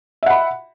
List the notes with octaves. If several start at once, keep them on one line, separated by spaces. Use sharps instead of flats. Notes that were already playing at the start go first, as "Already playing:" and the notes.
E5 F#5 B5